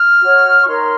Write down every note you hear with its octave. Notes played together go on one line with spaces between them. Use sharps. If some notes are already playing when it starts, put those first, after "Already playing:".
Already playing: F6
F#4 C#5
C#6
D#4 A#4 C#5 C6